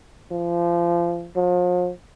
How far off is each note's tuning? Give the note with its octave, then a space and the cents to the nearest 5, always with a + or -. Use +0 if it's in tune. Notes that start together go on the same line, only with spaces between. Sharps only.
F3 -25
F3 +40